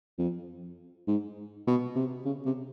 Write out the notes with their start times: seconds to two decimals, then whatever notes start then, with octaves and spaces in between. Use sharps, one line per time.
0.19 F2
1.07 G#2
1.67 B2
1.96 C3
2.25 C#3
2.46 C3